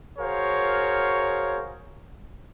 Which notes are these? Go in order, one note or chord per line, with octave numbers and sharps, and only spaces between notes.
F#4 G#4 A#4 C5 C#5 F5